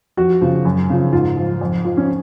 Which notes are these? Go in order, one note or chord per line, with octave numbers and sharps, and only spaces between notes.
F2 F#4
C#3 F3
F#2
C#3 F3
G#2 F4
F3
F2
F3
C#4